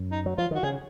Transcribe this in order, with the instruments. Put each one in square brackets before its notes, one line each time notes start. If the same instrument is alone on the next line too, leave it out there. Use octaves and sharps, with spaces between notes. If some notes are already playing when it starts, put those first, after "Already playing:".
Already playing: [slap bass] F#2
[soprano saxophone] D#4
[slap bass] F#3
[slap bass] F3 [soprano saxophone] F4
[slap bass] D#3 [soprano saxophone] F#4
[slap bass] C#3 [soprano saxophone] G#4